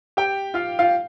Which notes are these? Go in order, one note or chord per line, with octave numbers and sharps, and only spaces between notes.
G4 G5
F4 F5
F4 F5